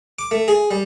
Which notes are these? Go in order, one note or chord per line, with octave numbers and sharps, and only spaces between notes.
D6
A3
G#4
G3